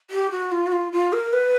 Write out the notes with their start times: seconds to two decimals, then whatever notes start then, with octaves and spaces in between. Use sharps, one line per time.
0.11 G4
0.31 F#4
0.52 F4
0.67 F#4
0.72 F4
0.92 F4
1.13 A#4
1.33 B4